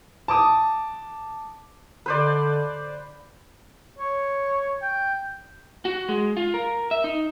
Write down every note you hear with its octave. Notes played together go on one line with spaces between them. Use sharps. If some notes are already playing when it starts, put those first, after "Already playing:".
A5 D6 D#6
D3 B4 C5 D5
C#5
G5
F#4
G#3
F4
A#4
E5
D#4